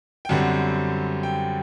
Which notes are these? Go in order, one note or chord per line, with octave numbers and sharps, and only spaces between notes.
G5
F#2 D3 G3 C4 F#5
G5